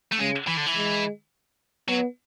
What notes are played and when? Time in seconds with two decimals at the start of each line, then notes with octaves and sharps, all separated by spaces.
0.12 A3
0.19 C#3 G#3
0.48 E3
0.57 D3
0.67 E3
0.76 G#3
1.88 F#3 B3